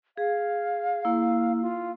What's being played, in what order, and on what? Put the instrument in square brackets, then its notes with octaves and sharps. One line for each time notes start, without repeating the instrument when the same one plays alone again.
[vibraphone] G#4 [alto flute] F5
[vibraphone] A#3 E4
[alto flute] F4